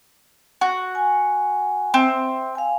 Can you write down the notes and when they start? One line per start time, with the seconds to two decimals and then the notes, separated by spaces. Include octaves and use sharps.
0.61 F#4
0.95 G#5
1.94 C4 E5
2.55 F5 G#5